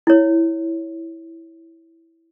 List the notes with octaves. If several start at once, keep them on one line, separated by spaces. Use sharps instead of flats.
E4 C#5